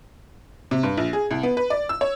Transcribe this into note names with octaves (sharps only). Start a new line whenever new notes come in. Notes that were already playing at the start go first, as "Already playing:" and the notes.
C3
G2
A#1
G#4
C2
B3
B4
D5
E6
C#5